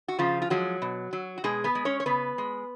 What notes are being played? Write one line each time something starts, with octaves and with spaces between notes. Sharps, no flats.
F#4
C#3 F3 F4
F4
F3 F#3 G#3 F#4
B2
F#3
F#4
B2 G#3 G#4
B3 B4
G#3
C#4 C#5
C#5
C#3 B3 B4
G#3